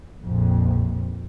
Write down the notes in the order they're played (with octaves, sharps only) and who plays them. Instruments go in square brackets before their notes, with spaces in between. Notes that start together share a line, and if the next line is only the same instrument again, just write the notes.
[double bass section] A#1 F2